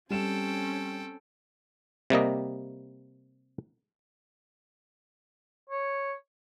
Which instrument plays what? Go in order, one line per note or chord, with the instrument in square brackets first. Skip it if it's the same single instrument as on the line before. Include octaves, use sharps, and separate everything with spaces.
[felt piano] G3 E7 [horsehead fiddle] C4 C#4 [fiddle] A4 G5
[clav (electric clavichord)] C3 G3 A#3 D#5
[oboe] C#5